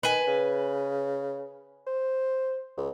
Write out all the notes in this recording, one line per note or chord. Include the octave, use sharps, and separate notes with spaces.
D#3 B4 G#5
C#3
C5
C#2